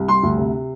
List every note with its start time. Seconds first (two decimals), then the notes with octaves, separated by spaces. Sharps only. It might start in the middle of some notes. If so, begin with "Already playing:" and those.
Already playing: C2
0.08 G3 C6
0.23 D2
0.38 C3